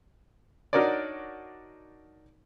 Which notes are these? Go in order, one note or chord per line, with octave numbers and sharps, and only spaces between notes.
D4 D#4 F#4 A#4 C#5 D5